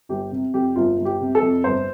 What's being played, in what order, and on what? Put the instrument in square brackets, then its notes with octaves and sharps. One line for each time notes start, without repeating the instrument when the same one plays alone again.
[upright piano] G1 G4
C3
F2 G4
G1 F4
G1
G4
C3
A4
F2
G1 C5